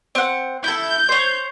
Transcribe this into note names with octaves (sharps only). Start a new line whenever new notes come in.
C4 F#5
E4 A4 G6
C5 C#5